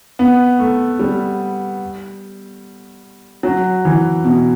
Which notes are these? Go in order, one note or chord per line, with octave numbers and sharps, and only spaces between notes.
B3
A3
G3
F#3
E3
B2